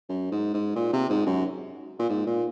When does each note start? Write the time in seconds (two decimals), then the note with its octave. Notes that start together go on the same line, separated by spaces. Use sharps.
0.09 F#2
0.32 G#2
0.54 G#2
0.76 A#2
0.93 C3
1.10 G#2
1.27 F#2
1.99 A#2
2.10 G#2
2.27 A#2